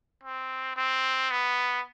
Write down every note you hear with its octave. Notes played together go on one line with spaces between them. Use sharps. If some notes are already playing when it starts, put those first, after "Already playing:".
C4
C4
B3